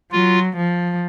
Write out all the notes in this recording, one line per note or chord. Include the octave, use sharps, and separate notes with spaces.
F#3 F4
F3